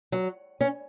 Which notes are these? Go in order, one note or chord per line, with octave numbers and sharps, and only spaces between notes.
F#3
C#4